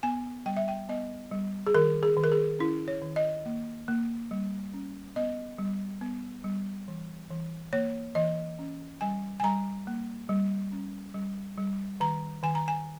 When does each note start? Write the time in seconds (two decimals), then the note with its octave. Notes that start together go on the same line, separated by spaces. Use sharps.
0.03 B3 G#5
0.46 G3 G5
0.57 E5
0.68 G5
0.89 B3 D#5
1.32 G3
1.67 G#4
1.74 D#3 A#4
2.03 G#4
2.17 D#3
2.24 A#4
2.32 G#4
2.59 C#4 E4
2.88 C#5
3.02 D#3
3.16 D#5
3.46 A#3
3.88 A#3
4.31 G3
4.73 C#4
5.16 B3 D#5
5.58 G3
6.01 B3
6.44 G3
6.88 E3
7.31 E3
7.73 A#3 C#5
8.15 E3 D#5
8.59 C#4
9.01 G3 G#5
9.40 G#5
9.44 G3 A#5
9.87 A#3
10.29 G3
10.72 C#4
11.14 G3
11.58 G3
12.00 D#3 A#5
12.43 D#3 G#5
12.55 A#5
12.68 G#5